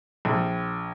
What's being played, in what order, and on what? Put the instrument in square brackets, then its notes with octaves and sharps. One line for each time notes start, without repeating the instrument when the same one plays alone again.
[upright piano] A#1